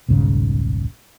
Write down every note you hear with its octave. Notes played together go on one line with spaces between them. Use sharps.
D#1 B1 G#2 C#3